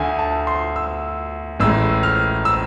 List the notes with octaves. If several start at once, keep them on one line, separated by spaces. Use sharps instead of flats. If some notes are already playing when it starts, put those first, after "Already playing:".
Already playing: D2 D3 A3 G#5
A5
C6
E6
A1 A2 G#3 E6
F6
E6